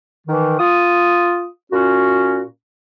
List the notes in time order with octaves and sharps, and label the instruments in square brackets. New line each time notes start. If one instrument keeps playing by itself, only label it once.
[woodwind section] D#3 E3
F4 D#6
A#2 C#4 F#4